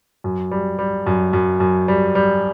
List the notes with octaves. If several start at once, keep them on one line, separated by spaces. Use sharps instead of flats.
F#2
G3
G3
F#2
F#2
F#2
G3
G3